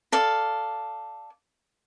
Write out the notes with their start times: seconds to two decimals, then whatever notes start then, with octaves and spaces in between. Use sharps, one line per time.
0.12 A4 D5 F5